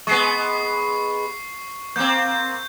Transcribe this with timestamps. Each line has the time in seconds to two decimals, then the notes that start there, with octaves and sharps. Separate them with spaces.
0.07 G#3 B3 C#6 C7
1.96 A#3 C4 G6